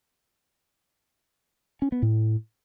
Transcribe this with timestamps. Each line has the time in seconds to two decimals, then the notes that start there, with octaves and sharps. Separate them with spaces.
1.82 C#4
1.92 B3
2.02 A2